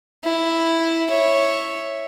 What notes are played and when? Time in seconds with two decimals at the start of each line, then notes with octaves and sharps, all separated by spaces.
0.24 E4
1.10 C#5 E5